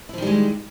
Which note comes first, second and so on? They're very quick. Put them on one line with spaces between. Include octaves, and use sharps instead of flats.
E4 F3 D#3 G3 G#3